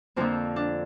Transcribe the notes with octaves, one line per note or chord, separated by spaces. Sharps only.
F2 D3 F3 A#3 C4
D4